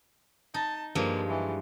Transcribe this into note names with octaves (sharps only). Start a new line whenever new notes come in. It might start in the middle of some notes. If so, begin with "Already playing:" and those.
D#4 A5
G2 F3 G#3 A#3
E3